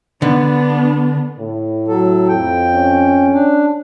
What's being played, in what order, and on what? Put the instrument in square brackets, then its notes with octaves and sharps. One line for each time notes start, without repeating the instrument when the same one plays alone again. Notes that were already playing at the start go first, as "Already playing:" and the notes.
[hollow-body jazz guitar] D3 [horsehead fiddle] B3 D4
[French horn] A2
[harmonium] F#3 A4
F2 G5
[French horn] C#4
[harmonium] D4